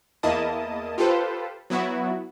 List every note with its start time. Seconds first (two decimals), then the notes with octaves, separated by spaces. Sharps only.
0.23 E2 A#3 E4 D#5 A5 D#6
0.98 F4 G4 A4 B4 C5
1.70 F#3 B3 E4 F#4